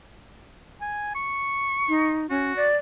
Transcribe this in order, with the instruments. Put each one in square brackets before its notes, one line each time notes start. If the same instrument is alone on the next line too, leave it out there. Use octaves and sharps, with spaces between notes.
[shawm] G#5
C#6
[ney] D#4
[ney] C#4 [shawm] F#4
[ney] D5